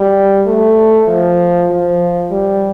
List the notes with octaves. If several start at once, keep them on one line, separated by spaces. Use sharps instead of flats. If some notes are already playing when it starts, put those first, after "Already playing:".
Already playing: G3
A3
F3
F3
G3